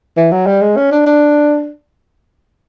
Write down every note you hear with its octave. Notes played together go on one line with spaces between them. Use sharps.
E3
F#3
G3
G#3
C#4
D4
D4